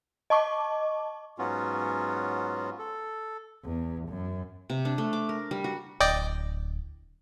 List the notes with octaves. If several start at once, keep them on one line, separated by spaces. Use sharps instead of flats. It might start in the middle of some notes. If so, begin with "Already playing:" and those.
D#5 A5 C#6 D6
G#2 F#3 B3 C#4 F4 F#4
A4
E2
F#2
C3
D4
A3
D6
A#4
G3
F#4
D1 D5 D#5 G5